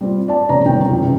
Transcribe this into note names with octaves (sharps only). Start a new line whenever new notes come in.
G3 C4 F4
D5 A5
E1 C#3 C#5 D5 A#5
G1 D#3 C4 C#5 G5
C#2 F#2
C#3 E3